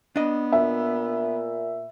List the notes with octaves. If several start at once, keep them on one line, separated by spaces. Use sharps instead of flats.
B3 D4 D#5
A#2 E5